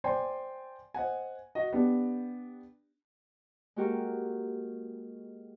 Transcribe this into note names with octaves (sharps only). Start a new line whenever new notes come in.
C5 D5 G5 G#5 C6
C5 D#5 F#5 G#5
F#4 D#5
B3 D4 G4
G#3 A#3 F#4 G4 A#4